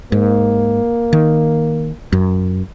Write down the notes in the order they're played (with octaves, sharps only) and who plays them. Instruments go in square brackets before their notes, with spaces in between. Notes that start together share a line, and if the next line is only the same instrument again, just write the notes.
[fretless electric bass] G#2 [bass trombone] A#3
[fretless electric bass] D#3
F#2